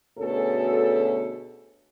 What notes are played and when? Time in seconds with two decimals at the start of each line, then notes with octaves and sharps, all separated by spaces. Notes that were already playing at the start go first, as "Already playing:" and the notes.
0.19 D2 B2 C#4 G#4 A4